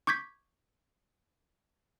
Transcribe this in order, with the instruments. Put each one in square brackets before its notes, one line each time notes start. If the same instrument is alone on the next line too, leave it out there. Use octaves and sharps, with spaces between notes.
[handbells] C#6 D6 G6 G#6 B6